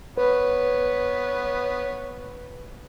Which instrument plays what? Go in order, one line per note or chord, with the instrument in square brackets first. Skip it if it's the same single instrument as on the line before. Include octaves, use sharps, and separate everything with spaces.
[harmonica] B3 C#5 [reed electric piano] B4